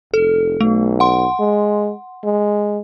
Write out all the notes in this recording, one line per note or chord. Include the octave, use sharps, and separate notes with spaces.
F1 A4
B1 A3
F#5 C6
G#3
G#3